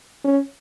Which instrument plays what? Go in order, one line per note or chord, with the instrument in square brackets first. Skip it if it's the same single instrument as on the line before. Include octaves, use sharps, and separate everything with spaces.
[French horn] C#4